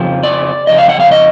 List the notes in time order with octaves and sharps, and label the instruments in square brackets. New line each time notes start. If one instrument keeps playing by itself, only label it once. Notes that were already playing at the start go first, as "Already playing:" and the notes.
Already playing: [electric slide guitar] F2 C#3 F3
D5
F2 C#3 D#5
F5
F#5
F5
D#5